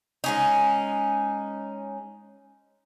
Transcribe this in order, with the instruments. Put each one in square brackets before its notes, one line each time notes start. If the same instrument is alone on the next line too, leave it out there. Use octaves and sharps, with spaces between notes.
[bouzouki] G#3 C#4 D#4